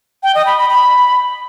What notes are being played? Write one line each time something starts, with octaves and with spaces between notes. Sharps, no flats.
G5
D#5
B5
B5
B5